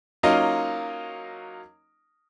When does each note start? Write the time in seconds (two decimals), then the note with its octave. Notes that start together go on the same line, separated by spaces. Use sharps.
0.23 F#3 A#3 C#4 D#4 F4 D#5